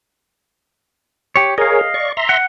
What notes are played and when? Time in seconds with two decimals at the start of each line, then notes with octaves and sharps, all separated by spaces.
1.36 G4 C#5
1.58 G#4 A#4 C#5 D#5 F5
1.94 D5 C#6
2.17 E5 A#5 C6
2.29 F#5